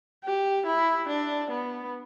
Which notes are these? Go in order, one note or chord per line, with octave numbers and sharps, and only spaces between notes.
G4
E4
D4
B3